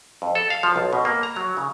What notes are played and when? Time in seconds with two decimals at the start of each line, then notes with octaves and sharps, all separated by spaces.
0.22 F2
0.35 A4
0.50 F5
0.63 F3
0.76 B1
0.93 B2
1.05 A#3
1.23 A#5
1.36 F#3
1.57 C#3